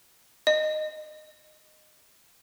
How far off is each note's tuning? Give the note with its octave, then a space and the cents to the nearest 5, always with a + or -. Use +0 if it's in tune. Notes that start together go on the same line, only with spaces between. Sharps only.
D#5 -15